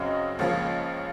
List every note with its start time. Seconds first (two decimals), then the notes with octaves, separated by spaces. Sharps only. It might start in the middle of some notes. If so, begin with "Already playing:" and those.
Already playing: F#2 C#3 F#3 C4 D#5
0.39 C#2 C#3 F3 A#3